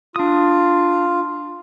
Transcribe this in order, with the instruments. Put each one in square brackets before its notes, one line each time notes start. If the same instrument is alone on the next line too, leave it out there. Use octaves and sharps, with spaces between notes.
[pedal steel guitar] D4 D#6 [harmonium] F4